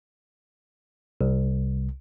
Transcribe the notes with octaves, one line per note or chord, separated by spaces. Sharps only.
C2